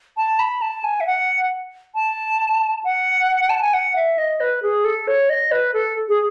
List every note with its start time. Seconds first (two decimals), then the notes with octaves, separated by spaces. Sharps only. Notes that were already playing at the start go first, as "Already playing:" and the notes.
0.17 A5
0.39 B5
0.61 A5
0.83 G#5
1.00 E5
1.06 F#5
1.94 A5
2.84 F#5
3.49 A5
3.60 G#5
3.73 F#5
3.95 E5
4.17 D#5
4.40 B4
4.62 G#4
4.84 A4
5.07 C#5
5.29 D#5
5.51 B4
5.73 A4
6.08 G#4